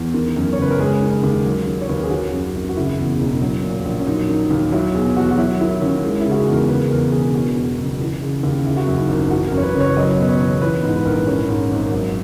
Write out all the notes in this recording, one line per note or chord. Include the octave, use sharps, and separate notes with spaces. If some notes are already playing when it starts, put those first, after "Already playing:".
Already playing: E2
D#3
F#2
C#5
F#1 B4
A#4
G#3 G#4
D#3
D#2
F#3
D#3
C#5
D#2 B4
A#4
G#4
D#3 F#4
F#2
G#1
F#4
C#3 E4
E2
E1
F#3
A#2
A#1
C#4
F#3 D#4
D#3
D#2
F#3 E4
B2 G#4
E2 F#4
F#4
F#3 E4
D#3 E4
D#2 C#4
G#3 D#4
E4
C#3
F#4
G#4
E2
A#4
C#3 B4
E2 A#4
E1 G#4
B2 F#4
E2
F#1
E3
C#3
D#2
C#3 E4
F#4
F#2 E4
D#4
G#1
E3 F#4
A#4
F#2
C#5
B4
F#1
C#5
F#3 D#5
B2 B4
C#5
E2
E3 B4
G#2
B4
A#1 A#4
D#3 C#4
G#2
G#1
F#3